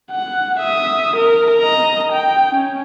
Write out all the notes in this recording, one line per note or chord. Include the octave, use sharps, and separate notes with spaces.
F#5
E5 D#6
A#4
D#5 A#5
G5
C#4